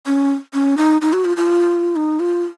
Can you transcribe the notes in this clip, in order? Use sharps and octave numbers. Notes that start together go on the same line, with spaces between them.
C#4
C#4
D#4
D#4
F#4
F4
F4
D#4
F4